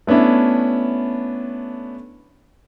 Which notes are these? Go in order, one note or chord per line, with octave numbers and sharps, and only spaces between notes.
A3 B3 C#4 D4 E4